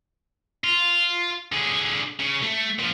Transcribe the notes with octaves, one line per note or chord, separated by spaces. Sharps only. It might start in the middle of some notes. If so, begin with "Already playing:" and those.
F4
D3 G#4
C#3
A3
A#2 F3